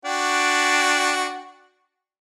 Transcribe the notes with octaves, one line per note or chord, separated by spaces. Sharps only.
D4 F#4 G5